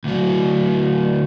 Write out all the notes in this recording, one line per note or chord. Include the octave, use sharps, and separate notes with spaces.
D2 F#3